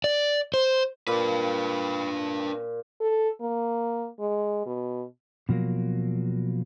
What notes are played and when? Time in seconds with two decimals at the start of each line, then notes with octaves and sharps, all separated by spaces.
0.04 D5
0.54 C5
1.07 A#2 D4 B4
3.01 A4
3.40 A#3
4.19 G#3
4.66 B2
5.49 B2 F3 F#3 A#3